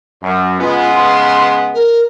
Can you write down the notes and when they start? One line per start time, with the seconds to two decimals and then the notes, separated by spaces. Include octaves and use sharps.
0.22 F#2
0.59 C#3 G#3 B3 F4
0.95 C6
1.74 A#4